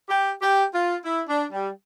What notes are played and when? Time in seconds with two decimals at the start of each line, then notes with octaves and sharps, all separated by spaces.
0.09 G4
0.42 G4
0.73 F4
1.04 E4
1.28 D4
1.52 G3